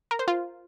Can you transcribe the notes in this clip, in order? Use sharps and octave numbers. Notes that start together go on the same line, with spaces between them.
A#4
C5
F4